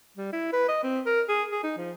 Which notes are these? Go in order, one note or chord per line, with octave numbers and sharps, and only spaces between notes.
G3
E4
B4
D#5
C4
A#4
G#4
G#4
D#4
F3